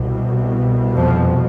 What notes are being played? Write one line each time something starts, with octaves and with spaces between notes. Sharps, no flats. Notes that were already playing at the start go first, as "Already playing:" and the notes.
Already playing: C2 B2
F2 F3